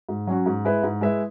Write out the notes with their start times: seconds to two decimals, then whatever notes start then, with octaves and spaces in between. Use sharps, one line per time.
0.09 G#2
0.27 F#3 C#4 F#4
0.46 G#2
0.65 G#3 E4 B4 E5
0.83 G#2
1.01 G#3 E4 B4 E5